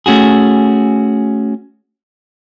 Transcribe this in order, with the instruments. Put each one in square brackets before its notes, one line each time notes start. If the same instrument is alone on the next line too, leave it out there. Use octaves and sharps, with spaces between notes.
[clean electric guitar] A3 C#4 F#4 G#4